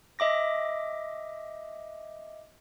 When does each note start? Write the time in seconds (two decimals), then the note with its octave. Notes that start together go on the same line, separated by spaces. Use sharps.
0.19 D#5 E5 D6 A#6